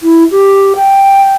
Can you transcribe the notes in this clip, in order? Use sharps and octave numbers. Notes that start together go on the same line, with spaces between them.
E4
G4
G5